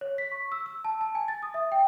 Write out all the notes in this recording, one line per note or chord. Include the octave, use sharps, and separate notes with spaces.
C#5
B6
C#6
E6
E6
A5
A5
G#5
A6
D#6
E5
G5